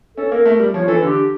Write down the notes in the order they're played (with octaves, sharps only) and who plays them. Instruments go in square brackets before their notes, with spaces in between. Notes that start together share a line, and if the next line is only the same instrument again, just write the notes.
[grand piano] C#4 [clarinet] A4
[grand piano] A#3 [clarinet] A#4
[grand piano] A3
G3
[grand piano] F3 [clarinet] C#5
[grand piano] E3 [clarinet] A4
[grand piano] D3 [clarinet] G4